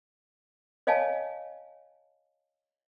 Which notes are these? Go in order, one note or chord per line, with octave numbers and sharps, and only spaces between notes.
C#5 D#5 F5 G#5 A5